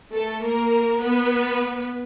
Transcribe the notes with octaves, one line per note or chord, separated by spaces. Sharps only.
A3 A4
A#3 A#4
B3 B4